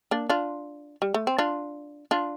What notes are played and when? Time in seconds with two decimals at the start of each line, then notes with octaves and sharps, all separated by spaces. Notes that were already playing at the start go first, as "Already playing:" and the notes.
0.11 A#3 D4
0.29 D4 F4
1.02 G3
1.14 A3
1.27 C4
1.38 D4 F4
2.11 D4 F4